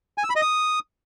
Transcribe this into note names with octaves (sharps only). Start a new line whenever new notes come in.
G#5
E6
B5
D#5
D#6